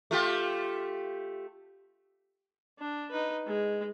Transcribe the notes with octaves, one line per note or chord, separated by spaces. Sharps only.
A3 F4 G4
D4
D#4 B4
G#3